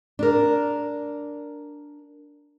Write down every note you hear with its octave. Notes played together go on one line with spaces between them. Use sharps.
D4 A#4